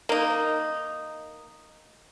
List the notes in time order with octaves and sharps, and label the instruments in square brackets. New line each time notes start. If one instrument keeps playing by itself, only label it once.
[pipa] A#3 D#4